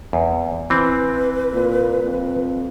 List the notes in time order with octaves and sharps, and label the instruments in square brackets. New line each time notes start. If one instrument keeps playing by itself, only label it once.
[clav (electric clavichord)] E2
[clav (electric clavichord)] E3 C4 [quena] B4
[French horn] A#2
F2